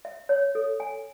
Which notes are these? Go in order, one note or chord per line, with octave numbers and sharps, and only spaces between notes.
E5
C#5
A4
G#5